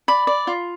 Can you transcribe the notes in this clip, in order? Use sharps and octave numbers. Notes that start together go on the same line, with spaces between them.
D5 B5
D5
F4